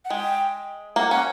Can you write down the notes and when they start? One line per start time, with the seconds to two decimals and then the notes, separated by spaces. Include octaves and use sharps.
0.05 F#5
0.10 G#3 G5
0.96 A#3 F#5
1.10 C#4 F#5